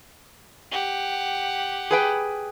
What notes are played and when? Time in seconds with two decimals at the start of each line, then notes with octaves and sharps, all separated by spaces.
0.72 G4 F#5
1.91 G#4 B4 G5